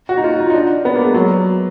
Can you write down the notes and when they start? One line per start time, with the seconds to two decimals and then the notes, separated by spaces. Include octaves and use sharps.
0.09 F#4
0.17 D#4
0.24 F4
0.40 D#4
0.50 D#4
0.54 D4
0.85 B3
0.95 A#3
1.05 G#3
1.14 F#3